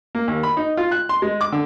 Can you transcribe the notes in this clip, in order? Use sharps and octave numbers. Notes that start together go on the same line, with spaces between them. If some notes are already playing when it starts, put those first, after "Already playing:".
A#3
D#2
B5
D#4
F4
F#6
C6
G#3
D6
D3